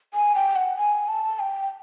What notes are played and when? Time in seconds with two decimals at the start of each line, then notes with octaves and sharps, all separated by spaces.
0.14 G#5
0.35 G5
0.56 F#5
0.77 G#5
1.08 A5
1.40 G5